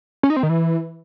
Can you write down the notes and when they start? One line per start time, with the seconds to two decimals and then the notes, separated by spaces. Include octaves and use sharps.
0.23 C#4
0.30 D#4
0.36 C4
0.43 D#3
0.49 E3